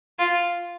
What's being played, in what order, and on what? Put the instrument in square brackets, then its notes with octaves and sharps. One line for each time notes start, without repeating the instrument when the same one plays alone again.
[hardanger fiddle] F4